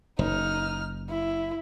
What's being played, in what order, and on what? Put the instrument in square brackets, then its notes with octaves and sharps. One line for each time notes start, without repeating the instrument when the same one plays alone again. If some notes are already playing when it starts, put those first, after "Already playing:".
[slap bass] F#1 [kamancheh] D#4 F6
[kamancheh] E4